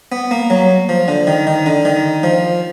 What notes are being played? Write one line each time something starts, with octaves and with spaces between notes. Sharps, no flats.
B3
A#3
F#3
F3
D3
D#3
D#3
D3
D#3
F3